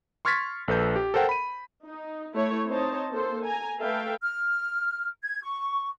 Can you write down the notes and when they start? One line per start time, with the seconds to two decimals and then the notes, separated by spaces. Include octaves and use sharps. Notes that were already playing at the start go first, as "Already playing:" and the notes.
0.25 C6 C#6 F6 G#6 A6 B6
0.68 A#1 A4 B4 G6
0.96 G4
1.14 A4 A#4 C5 F#5 G5
1.29 B5 D#7
1.86 D#4
2.36 A3 E4 C#5
2.68 C4 D#4 C5 C#5 D#5 A5
3.12 A#3 A4 C5
3.45 G#5 A#5
3.80 A3 A4 B4 E5 F5 G5
4.22 F6
5.23 G#6
5.43 C#6